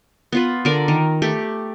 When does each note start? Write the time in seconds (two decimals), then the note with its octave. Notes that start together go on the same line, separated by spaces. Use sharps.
0.32 B3 F4 B4
0.65 D3 A#4 D5
0.88 D#3
1.22 A3 G4